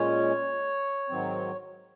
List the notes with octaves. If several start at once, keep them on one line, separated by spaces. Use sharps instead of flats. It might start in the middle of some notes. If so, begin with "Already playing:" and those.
Already playing: A#2 G#3 C#4 C#5
G#2 D#3 F#3 C4